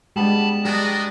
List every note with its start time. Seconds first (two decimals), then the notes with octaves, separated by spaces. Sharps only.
0.16 G3 G#3 B3 D4 A5 B5
0.65 G3 D4 F#4 G#4 A#4 D5 D#5